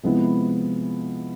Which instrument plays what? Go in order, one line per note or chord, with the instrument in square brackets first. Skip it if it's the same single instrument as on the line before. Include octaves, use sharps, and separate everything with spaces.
[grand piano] C3 F3 G#3 B3 E4